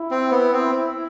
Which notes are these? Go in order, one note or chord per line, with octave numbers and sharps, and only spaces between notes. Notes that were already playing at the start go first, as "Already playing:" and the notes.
Already playing: E4
C4
B3
C4